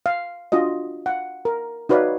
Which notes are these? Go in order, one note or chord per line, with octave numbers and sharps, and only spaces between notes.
F5
D4 F4 F#4 D#5
F5 F#5
A#4
D#4 F#4 B4 C#5 D5 F5